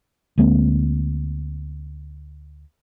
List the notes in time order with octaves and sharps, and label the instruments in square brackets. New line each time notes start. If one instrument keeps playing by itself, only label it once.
[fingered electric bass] D2 G#3 A#3 C4